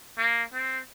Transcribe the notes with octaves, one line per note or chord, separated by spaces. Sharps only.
A#3
C4